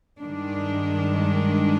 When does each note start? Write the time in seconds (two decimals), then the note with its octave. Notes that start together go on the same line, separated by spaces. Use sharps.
0.20 G2 D#3 G#3 D4